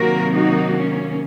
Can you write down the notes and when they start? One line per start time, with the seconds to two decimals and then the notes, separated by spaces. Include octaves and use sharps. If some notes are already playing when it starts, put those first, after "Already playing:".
Already playing: C3 D#3 F#3 A#3 F#4 A#4
0.35 D#4 F#4
0.76 C#4